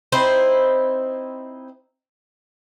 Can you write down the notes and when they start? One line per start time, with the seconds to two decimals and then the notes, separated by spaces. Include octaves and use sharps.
0.12 C4 D#4 E4 C5